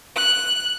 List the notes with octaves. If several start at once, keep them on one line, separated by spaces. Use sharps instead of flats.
F#6